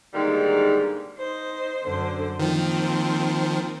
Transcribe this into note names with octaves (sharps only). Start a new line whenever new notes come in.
G#2 D3 D#3 G3 G#3 A#3
D#4 C5
F#2 D3 C5
D#3 F3 A#3 C4